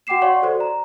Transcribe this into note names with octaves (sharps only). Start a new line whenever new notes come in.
F#4 F#5 G5 D6 C7 E7
C#5 D5 F5 F#5 C6 C#6
F#4 A4 C5 D5
A#5